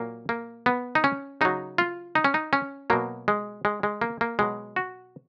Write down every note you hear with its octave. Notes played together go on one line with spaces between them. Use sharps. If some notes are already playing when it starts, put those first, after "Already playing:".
Already playing: A#2 F#3 A#3
A#3
B3
D#4
C#4
C#3 F#3 D#4
F4
D#4
C#4
D#4
C#4
B2 F#3 A#3
G#3
G#3
G#3
A#3
A#3
B2 F#3 G#3
F#4